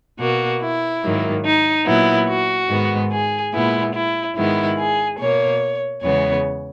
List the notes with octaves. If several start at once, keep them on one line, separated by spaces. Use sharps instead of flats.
B2 A#3 F#4
E4
G#2 D#3 F#3 A#3
D#4
A#2 F#3 B3 E4
F#4
G#2 D#3 G#3 B3
G#4
A#2 G#3 B3 E4
E4
G#2 D#3 G#3 B3 E4
G#4
B2 A#3 C#5
E2 C#3 E3 G#3 B3 C#5